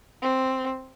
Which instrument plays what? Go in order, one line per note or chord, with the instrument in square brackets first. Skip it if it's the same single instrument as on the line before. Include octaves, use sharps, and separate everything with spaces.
[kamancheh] C4